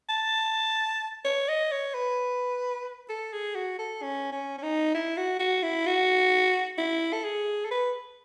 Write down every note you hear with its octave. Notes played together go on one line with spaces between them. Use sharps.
A5
C#5
D#5
C#5
B4
A4
G#4
F#4
A4
C#4
C#4
C#4
D#4
E4
F#4
F#4
E4
F#4
E4
A4
G#4
A4
B4